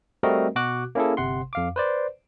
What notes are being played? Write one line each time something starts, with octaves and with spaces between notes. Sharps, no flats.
G3 A3 C4 F#4 A#4 D#5
B2 F#4 D6 F#6
A#3 C#4 E4 G#4 A4
G1 C3 F#5 C6
F2 F5 D6
B4 C5 D5